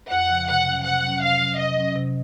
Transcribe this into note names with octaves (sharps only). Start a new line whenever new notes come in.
F2 F#5
C#3 F3
C3 F#5
F#3 C#4
C3 F#5
F#3 C#4
C3 F5
F#3 C#4
C3 D#5
F#3 C#4
C3